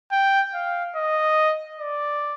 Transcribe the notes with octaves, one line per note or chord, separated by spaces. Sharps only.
G5
F5
D#5
D5